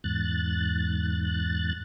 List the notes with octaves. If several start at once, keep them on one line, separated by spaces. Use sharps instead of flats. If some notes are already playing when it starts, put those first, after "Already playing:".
E2 G#2 F#6 A6